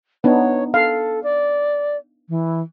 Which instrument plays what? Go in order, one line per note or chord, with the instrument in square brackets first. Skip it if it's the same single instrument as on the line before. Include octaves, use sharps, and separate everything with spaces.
[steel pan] B3 D4 D#4 [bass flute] C#5
[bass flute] A4 [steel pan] F5
[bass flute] D5
E3